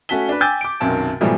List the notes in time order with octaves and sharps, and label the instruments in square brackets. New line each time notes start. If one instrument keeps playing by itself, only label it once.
[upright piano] A3 C#4 F#4 A5 B6 G7
D4 B4
G5 G#5 D6 E6 G6 A6
D6 D7
B1 F#2 C3 D#3 A5
G#2 B2 E3 F3 G3 A3